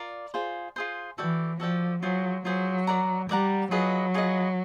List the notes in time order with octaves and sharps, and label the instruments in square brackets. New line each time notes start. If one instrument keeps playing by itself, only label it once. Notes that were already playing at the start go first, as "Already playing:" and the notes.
Already playing: [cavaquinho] F4 A#4 D5
F4 G#4 C5
F4 G#4 C5
[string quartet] E3 [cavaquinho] F#4 A4 D5 G5
[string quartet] F3 [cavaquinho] F#4 A4 D5 G5
[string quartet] F#3 [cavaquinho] F4 G#4 C5
[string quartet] F#3 [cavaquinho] F4 G#4 C5
[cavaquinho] A#4 D5 F#5 A#5
[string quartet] G3 [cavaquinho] A#4 D5 F#5 A#5
[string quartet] F#3 [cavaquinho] F4 G#4 B4 D#5
[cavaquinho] F4 G#4 B4 D#5